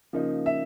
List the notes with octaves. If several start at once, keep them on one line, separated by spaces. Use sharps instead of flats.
C#3 F3 A#3 D#4
E5